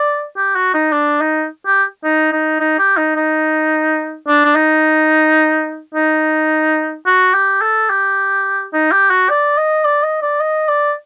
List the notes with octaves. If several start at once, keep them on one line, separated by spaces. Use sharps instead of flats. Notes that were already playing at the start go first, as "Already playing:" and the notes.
Already playing: D5
G4
F#4
D#4
D4
D#4
G4
D#4
D#4
D#4
G4
D#4
D#4
D4
D4
D#4
D#4
F#4
G4
A4
G4
D#4
G4
F#4
D5
D#5
D5
D#5
D5
D#5
D5